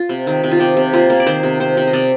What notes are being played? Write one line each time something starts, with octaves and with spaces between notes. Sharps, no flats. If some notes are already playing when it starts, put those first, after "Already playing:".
Already playing: F4
C3
D#3
C3
F4
C3 G4
C3
A#3 F4
A#3
D5
D#3 C5
C3
C3 C5
C3
D#5
C3 D5